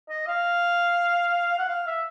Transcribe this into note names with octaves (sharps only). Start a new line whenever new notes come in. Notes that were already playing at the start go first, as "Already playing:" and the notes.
D#5
F5
F#5
F5
E5